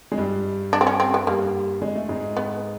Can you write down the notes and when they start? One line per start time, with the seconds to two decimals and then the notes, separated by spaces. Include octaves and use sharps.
0.12 G#3
0.18 G2 G3
0.73 D4
0.81 C4
0.87 C#4
1.00 C4
1.14 B3
1.27 G2 G3 A#3
1.82 G#3
1.95 A3
2.09 G#2 G#3
2.37 B3